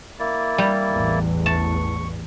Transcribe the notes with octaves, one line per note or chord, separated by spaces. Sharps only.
A#3 E4 D5
G3
A1 E2 E3
A5 C#6